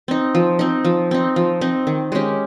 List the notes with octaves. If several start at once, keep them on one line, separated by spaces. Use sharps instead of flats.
C4 D#4
F3
C4 D#4
F3
C4 D#4
F3
C4 D#4
D#3
G#3 C#4 G4